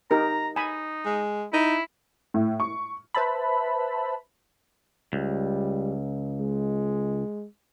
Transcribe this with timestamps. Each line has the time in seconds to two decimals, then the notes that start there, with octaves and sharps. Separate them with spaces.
0.11 D#4 G4 A#4 A#5
0.56 D#4 G#5 B5
1.06 G#3
1.53 D#4 E4
2.34 A2
2.60 C#6
3.15 B4 C5 E5 A5 B5
5.13 C#2 G3
6.41 G#3